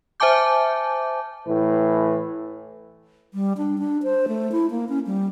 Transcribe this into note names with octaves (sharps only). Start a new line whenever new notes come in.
C5 E5 G#5 A5 D6 G6
A2 E3 B4
G3
D4
D4
C5
A3
E4
A#3
C#4
G3